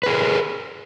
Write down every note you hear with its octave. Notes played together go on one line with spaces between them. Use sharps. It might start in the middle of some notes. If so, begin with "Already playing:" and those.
G#4 A#4 B4